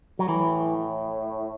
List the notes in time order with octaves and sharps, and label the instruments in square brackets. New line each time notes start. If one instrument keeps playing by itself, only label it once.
[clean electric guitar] F#3
[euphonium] A2 [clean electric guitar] E3